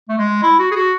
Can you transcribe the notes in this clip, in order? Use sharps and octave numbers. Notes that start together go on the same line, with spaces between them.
A3
G#3
E4
F#4
G#4
F#4